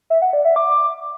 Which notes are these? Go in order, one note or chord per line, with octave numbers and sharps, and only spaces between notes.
E5
F#5
D5
E5
D6